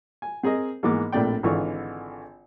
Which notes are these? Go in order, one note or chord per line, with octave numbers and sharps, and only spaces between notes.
G#5
C4 G#4 A#4 D#5
G#2 E3 A#3 B3 D6
A#1 A2 C4 D5 G5
G#1 D3 E3 F4 C#6